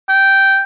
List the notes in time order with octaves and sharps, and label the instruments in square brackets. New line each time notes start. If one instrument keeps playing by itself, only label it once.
[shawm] G5